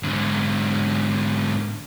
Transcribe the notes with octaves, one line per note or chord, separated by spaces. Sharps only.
G#2 D3